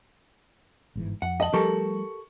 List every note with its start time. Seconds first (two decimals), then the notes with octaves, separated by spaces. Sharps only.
0.96 G1 G#2 E3
1.22 F2 F#5
1.40 D#5 A5 F#7
1.53 F3 G3 A3 G4 A4 A#4 C#6